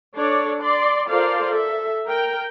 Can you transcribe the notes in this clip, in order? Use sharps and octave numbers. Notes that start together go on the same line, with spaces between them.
D4 A4 C#5 D5
D5 C6
F4 A4 A#4 C5 D5 F5
A4 E5
A#4 G5